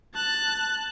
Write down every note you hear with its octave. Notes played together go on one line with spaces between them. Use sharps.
A5 F#6